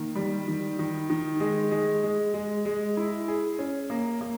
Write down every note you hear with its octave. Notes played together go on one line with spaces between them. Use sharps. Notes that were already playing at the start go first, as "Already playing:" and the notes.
Already playing: D#3 A#3
G3
D#3
D#3
D#3
G#3
G#3
G#3
G#3
G#3
E4
G#4
C#4
A#3
A#3